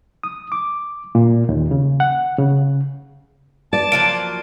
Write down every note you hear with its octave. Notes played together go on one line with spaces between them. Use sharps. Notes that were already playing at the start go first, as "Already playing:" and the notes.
D#6
D6
A#2
D#2
C#3
F#5
C#3
D5 A5
F3 F#3 A#3 D7